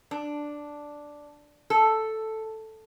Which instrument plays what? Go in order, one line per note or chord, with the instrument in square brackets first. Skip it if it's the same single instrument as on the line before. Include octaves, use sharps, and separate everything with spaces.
[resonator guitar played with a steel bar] D4
A4